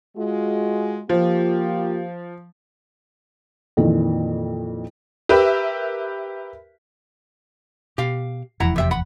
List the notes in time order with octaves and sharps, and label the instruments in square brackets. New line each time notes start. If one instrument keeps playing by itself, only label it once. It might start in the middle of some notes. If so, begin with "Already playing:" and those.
[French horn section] G#3 F4 F#4
[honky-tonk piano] F3 [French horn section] A#3 F4 G4
[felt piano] F2 A#2 D#3 E3
[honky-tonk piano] G4 A#4 B4 E5
[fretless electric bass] B2 [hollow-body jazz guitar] G4 F5
[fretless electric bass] F1 E2 F3 [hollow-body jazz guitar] E4 F#5 A#5
[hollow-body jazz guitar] C3 E5 G5
F#5 B5